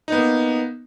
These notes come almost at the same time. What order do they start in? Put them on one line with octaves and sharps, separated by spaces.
D#4 B3 A#3